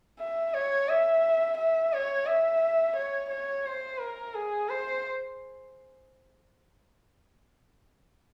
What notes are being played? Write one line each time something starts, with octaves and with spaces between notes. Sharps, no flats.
E5
C#5
E5
E5
C#5
E5
C#5
C#5
C5
A#4
G#4
C5